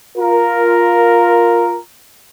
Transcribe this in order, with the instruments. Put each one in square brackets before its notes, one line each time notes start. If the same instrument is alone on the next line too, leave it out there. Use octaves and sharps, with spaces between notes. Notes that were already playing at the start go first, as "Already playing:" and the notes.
[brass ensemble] F4 A#4